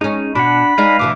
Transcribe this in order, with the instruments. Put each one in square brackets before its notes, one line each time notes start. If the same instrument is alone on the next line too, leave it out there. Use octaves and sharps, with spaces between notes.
[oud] G#3 C#4 [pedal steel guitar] D#4
[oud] B2 [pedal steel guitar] D4 F#5 [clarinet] B5
[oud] G#3 D#4 D5 [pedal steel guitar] B4 F5
[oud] D2 B2 E3 [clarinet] D6